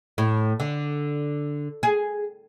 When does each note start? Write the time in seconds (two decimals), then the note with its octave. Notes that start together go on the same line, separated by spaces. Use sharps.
0.18 A2
0.60 D3
1.83 G#4